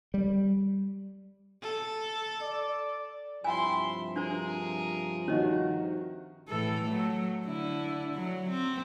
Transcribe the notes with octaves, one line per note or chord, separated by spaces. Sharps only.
G3
A4
D5
G2 C3 F3 E4 G5 G#5 C6
D4 F#4 G#4 A#4 C5
D#3 F#4 C#5 D#5
A2 E3 A4
F#3 A3
D3 E4
F#3
C4